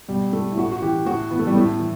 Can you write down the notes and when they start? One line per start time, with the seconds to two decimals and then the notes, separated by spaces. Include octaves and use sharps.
0.08 B2 G3
0.33 A3
0.52 E4
0.57 A2 F#4
0.72 F#4
0.82 E3 G4
1.06 A2 F#4
1.31 E3 B3
1.39 A3
1.47 G3
1.55 A2 A3
1.80 E3